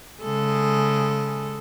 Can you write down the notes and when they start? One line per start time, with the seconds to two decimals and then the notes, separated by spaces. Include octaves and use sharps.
0.22 C#3 G#3 A4